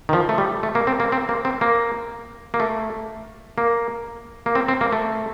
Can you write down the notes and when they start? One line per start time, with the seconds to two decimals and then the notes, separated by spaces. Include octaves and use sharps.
0.09 D#3
0.13 F3
0.29 A3
0.38 G3
0.63 A3
0.75 A#3
0.87 C4
1.00 A#3
1.12 C4
1.29 A#3
1.45 C4
1.61 A#3
2.54 A#3
2.60 A3
3.58 A#3
4.46 A#3
4.55 C4
4.68 C4
4.81 A#3
4.92 A3